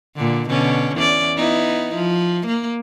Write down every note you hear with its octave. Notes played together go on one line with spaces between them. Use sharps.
A#2 D3
B2 D3 C#4
E2 C#4 D5
B3 D#4 E4
F3
A#3